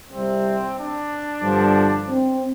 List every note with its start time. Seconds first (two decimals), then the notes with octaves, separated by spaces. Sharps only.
0.11 C2 C3 G3 C4
0.78 D4
1.42 G2 D3 F3
2.08 C4